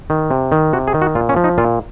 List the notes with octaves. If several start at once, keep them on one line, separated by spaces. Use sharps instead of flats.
D#3
C3
D#3
C3 F#4
G#4
D#3
F#4
A#2 F4
C#4
F3
D#4
A#2 F4